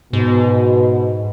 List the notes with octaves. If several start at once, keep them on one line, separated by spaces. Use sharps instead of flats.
G#2 B2